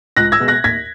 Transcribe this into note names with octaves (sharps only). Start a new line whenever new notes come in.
C#2 F#6 A#6
E6 G#6
B2 G#3
F#6 A#6
D#2 G#6 B6